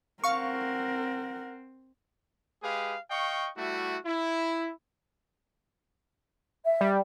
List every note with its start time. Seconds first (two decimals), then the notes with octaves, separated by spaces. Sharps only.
0.24 C4 A#4 F5 F#5 C#6
2.63 G#3 G4 G#4 B4 F5
3.11 D#5 F5 G5 C#6
3.57 G3 A3 E4 F#4
4.05 E4
6.65 E5
6.81 G3